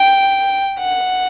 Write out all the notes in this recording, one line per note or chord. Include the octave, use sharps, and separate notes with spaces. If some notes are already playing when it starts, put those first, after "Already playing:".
Already playing: G5
F#5